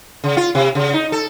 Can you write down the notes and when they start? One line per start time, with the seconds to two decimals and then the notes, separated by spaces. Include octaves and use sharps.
0.24 C#3
0.37 F4
0.55 C3
0.75 C#3
0.93 D#4
1.12 A4